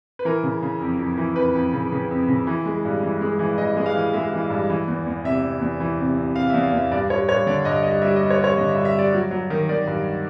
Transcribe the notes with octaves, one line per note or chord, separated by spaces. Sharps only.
B4
E3 A#4
C#3
C#3
F2
F2
E3
F2 B4
F2
C#3
C#3
F2
C#3
E3
G#3
G2
E3
G#3
E3
E3 D#5
G#3
F5
E3
G#3 E5
E3
G2
E3
E2
E2
C3 E5
C3
E2
E3
C3
C3
C3 F5
E5
E2
F5
E2 E5
G2 D5
G2 C#5
G2 C#5
D3 D5
G2 D#5
G3 D#5
G3 E5
D#5
G3
C#5
G3
C#5
D3 D#5
E5
G2
E5
G3 D5
F#3
F#3
D#3
D#3 D5
G2